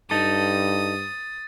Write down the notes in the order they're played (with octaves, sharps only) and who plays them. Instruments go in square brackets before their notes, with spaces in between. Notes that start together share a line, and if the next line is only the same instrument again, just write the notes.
[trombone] G2 [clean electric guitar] D#4 A4 [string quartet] D#6 [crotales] A6